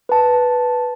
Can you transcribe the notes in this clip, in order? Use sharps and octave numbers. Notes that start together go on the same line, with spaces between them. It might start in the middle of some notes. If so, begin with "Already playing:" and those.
B4 A5